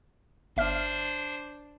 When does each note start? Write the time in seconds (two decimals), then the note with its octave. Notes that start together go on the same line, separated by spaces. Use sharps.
0.57 G1 D4 C5 E5 F6